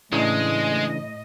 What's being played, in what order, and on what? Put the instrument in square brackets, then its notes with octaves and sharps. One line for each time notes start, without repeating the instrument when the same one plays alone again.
[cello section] A2 D#5 [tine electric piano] C#3 E3 D4 [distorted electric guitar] G#3